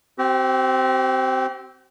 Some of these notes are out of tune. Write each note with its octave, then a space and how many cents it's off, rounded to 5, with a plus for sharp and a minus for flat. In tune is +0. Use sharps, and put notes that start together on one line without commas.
C4 +0 G4 -45